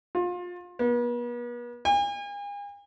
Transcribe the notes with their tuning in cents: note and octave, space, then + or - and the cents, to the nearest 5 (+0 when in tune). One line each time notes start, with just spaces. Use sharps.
F4 +30
B3 -40
G#5 -40